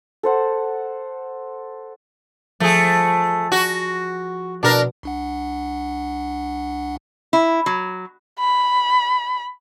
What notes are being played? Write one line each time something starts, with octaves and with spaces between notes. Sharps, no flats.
A4 C5 F#5
F3 A3 G#4
F#4
B2 D4 A#4
C2 D4 F#5
E4
F#3
B5